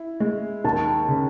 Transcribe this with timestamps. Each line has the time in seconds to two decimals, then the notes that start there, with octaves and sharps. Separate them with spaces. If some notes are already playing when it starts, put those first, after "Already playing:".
Already playing: E4
0.20 G#3
0.64 D#2 A5
1.09 C#3